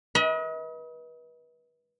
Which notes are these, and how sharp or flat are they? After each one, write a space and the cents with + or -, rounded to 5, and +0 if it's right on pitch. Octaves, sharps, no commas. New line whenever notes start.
B4 -30 D#5 +40